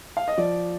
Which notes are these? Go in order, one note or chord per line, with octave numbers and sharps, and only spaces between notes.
F5
D#5
F3 D5